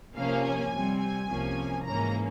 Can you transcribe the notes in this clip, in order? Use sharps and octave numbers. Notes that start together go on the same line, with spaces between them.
C3 F3 A#3 C#4 F5
G#5
C3 G3 C4
G#5
C2 C3 F3 A#3 C#4
G#2 E3 A#3 C#4 A#5